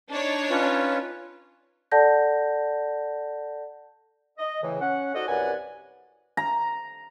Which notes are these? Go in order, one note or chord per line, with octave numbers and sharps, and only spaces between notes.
D4 D#4 C#5
C#4 F4 B4
A4 D5 F#5 A5 G6 A#6
D#5
A2 C#3 E3
C#4 F#5
D#4 F#4 A4 C5 D5 D#5
C2 F#2 B4 D5 F#5 G#5
A#5